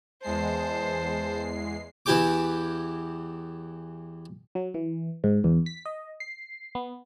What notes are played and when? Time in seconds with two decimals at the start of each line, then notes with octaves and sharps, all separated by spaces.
0.23 E2 G#3 C5 A5 C7
2.06 E2 E3 E4 G4 G5 D6
4.55 F#3
4.74 E3
5.24 G#2
5.44 E2
5.66 B6
5.85 D#5
6.20 C7
6.75 B3